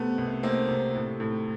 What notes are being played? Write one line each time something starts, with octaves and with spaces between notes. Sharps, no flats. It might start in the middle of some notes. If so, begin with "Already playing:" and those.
Already playing: C3 A3 B3
C2
A3 A#3 C4
C3
A2
A2